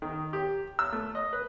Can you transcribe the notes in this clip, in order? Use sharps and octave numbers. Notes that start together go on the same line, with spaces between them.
D#3
G4
E6
A3
D#5
B4